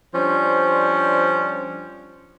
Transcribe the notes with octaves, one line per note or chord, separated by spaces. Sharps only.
F3 G3 C#4 D4 C5